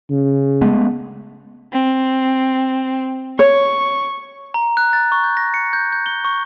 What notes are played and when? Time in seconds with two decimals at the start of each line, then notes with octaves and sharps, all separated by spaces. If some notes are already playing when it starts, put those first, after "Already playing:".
0.10 C#3
0.61 G#3 A3 B3
1.73 C4
3.39 C#5 C#6
4.54 A#5
4.77 F#6
4.93 A6
5.12 C#6
5.24 G6
5.37 A#6
5.54 C#7
5.73 G6
5.92 G6
6.06 G7
6.25 C#6